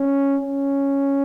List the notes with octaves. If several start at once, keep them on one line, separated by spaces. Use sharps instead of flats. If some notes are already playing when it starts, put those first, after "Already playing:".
Already playing: C#4
C#4